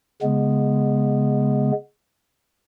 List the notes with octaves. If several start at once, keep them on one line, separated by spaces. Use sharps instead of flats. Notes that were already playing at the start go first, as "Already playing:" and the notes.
C#3 G#3 B3